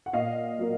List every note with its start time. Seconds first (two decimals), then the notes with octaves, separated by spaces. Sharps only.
0.06 F#5
0.13 A#2 D#5 F5
0.58 F#3 A#3